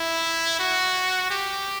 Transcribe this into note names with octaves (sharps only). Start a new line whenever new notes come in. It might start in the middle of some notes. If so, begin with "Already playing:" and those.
Already playing: E4
F#4
G4